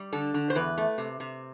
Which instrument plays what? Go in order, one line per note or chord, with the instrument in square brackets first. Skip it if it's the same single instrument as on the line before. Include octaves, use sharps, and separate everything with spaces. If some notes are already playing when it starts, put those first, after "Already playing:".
Already playing: [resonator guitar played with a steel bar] G3
D3 A4
D3
C5
E2 B4
A3
C3
C3